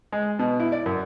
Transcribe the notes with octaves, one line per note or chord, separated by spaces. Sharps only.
G#3
B2
E4
D5
F#2